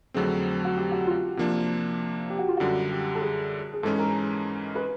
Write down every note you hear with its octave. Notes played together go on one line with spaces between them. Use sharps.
F2 D3 F#3 A3 C4 G#4
F#4
G4
F#4
F4
C3 F3 A#3 D4
G4
F#4
F4
F#2 D3 G3 F#4
G4
A4
G#4
G#4
G#2 E3 G#3 C#4 A4
A#4
B4